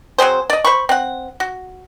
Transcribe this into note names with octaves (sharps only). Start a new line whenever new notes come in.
F#3 C4 G#4 C5
D5 D#5
C5 B5 C#6
C4 F#5
F#4